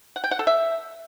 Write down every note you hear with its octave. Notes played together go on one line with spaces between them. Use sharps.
F#5
G5
F#5
A4
E5